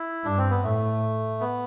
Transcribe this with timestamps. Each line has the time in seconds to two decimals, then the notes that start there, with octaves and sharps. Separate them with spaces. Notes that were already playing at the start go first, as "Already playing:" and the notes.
Already playing: E4
0.25 G2 D4
0.38 C4
0.51 B3
0.63 A2 A3
1.40 B3